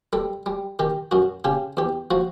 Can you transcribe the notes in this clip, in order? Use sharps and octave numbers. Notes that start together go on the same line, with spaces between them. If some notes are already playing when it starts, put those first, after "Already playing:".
G3 A4
G3
D#3 G4
F#2 F#4
C#3 G4
E2 G4
F3 F#4